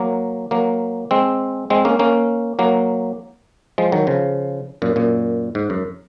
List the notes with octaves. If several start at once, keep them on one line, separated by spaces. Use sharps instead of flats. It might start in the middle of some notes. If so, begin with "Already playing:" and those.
Already playing: F#3 A#3
F#3 A#3
G#3 C4
G#3 C4
A#3 C#4
A#3 C#4
F#3 A#3
F3 G#3
D#3 F#3
C#3 F3
F#2 A#2
F#2 A#2
G#2
F#2